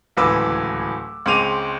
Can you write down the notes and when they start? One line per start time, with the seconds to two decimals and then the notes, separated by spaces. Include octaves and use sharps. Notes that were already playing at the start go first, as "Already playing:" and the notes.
0.17 D1 C#2 E3 B4 D6 E6
1.26 C#2 G#3 C4 D6 D#7 F7